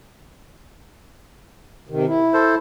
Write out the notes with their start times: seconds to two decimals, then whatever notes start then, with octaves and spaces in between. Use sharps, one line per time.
1.89 C3 D#3
2.07 E4
2.34 A4 C5